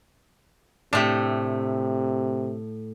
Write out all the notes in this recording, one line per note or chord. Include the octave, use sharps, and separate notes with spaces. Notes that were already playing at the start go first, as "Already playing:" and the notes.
A2 C3 A3 D4 G4